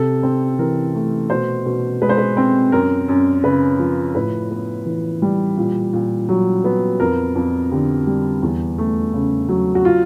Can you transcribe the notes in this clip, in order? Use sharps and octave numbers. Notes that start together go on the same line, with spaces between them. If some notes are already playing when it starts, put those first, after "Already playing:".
Already playing: C3 A4
C4
E3 A#4
A3
B2 C5
B2
G#3 B4
C5
B4
C4
F#2 A#4
F#2
C#3 B4
F3
A2 B4
B3
E3
G3
A#2
A#2
F#3
B3
F2 A#4
F2
D3 G4
G3
E2
A3
C#3
F#3
F#4
F4